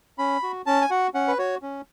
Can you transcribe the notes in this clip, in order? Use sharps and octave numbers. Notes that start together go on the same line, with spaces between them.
C#4 B5
F#4
C#4 A5
G#5
F#4 F#5
C#4 F#5
B4
F#4 C#5
C#4